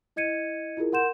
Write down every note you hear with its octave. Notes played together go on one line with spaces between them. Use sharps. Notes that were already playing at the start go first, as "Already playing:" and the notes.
E4 D#5 G#6 C#7 D#7
E4 F4 G#4 A#4
A#4 F#5 C6 G6 E7